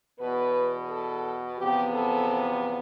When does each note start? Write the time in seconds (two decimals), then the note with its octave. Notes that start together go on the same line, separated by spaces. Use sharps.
0.20 E2 B2 B3 B4
0.89 A4
1.59 E2 C3 F3 B3 G4
1.94 A4